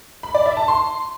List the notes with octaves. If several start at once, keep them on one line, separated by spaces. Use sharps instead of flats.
B5
D5
E5
A5
C6